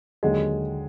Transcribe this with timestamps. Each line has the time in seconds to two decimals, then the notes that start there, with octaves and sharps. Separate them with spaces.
0.23 D#2 D3 F#3 G#3